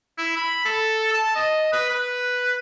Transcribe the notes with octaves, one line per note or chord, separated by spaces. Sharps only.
E4
B5
A4
A5
D#5
B4
B4